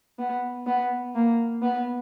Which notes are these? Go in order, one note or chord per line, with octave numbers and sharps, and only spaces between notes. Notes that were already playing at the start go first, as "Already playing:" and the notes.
B3
B3
A#3
B3